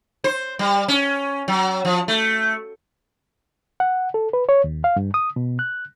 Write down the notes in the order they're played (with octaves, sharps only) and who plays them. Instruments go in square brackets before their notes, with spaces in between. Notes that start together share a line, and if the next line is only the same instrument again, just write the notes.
[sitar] C5
G3
C#4
F#3
F3
A3
[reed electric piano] F#5
A4
B4
C#5
D#2
F5
G2
D#6
B2
F#6